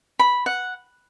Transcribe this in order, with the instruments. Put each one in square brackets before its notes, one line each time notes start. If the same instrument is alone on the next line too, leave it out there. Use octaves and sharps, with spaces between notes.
[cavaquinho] B5
F#5